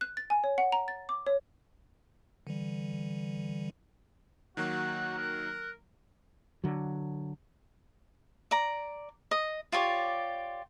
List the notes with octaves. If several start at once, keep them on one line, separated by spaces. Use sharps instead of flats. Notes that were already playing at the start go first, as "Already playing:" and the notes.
F#6
A6
G#5
C#5
F#5
A#5
A6
D6
C#5
D3 E3 G3
D#3 F#3 A#3 F#4 F#6
A#4
D3 F#3
D5 A#5
D#5
F4 G4 C#5 D5